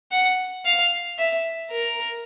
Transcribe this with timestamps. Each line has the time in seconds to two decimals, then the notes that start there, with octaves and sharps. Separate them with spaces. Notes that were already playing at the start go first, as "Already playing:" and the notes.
0.11 F#5
0.65 F5
1.18 E5
1.71 A#4